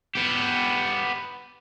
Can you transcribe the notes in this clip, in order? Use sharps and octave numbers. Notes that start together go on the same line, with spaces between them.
B3 G4